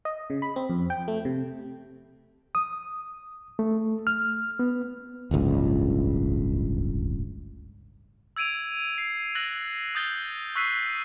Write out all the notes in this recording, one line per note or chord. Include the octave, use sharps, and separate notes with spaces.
D#5
C#3
B5
C4
F2
G5
A3
C3
D#6
A3
F6
B3
D1 G1 C#2
E6 G#6 D7 D#7 F7
C7
E6 F#6 A6 A#6 F#7
D#6 G6 A6 G7
C#6 E6 F#6 B6 C7 D#7